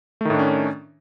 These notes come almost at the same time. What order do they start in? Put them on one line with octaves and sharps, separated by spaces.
A3 D#3 A2 D4 C#4